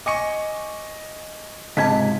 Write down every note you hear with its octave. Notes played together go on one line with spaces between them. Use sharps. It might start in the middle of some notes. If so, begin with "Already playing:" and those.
D#5 G#5 C#6 D6 C#7
C#2 G#2 C3 A5 G#6 B6